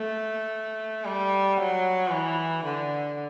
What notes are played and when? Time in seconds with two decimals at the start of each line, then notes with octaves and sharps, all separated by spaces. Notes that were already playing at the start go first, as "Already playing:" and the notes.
Already playing: A3
1.05 G3
1.57 F#3
2.11 E3
2.64 D3